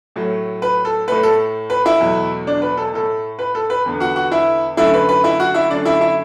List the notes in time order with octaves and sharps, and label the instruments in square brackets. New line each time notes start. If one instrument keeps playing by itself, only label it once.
[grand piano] A2 F#3 A3
B4
A4
A2 A3 B4
A4
B4
E4 E5
E2 B2 F#3 A3
D4 D5
B4
A4
A2 A3 A4
B4
A4
B4
E2 D3 B3
F#4 F#5
F#4 F#5
E4 E5
F#2 D3 A3 E4 E5
B4
B4
E4 E5
F#4 F#5
E4 E5
F#2 D3 A3 D4 D5
E4 E5
E4 E5